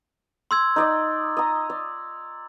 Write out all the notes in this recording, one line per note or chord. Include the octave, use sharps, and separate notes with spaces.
C6 E6 G#6
D#4 D5 D#5
D#5 A#5
D5